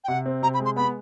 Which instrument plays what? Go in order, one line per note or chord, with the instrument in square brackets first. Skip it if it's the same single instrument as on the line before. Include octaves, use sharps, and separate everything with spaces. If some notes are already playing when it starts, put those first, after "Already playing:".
[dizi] G5
[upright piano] C3 [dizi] F#5
[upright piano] C4
[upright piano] C3 [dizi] A#5
[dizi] B5
[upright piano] G#3
[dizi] C6
[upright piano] B3 [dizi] B5